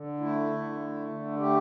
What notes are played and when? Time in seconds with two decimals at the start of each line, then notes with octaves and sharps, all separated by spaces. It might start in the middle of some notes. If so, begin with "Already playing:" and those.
Already playing: D3
0.20 A3 E4
0.50 D3
0.79 A3
1.10 D3
1.39 A3 G4